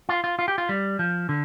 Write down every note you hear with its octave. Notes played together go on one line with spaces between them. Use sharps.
F4
F4
F4
G4
F4
G3
F3
D3